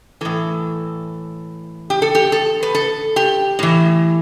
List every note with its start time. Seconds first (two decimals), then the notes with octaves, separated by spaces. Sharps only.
0.21 A2 E3 A4
1.90 G4
2.02 A4
2.15 G4
2.32 A4
2.63 B4
2.75 A4
3.16 G4
3.59 A2 E3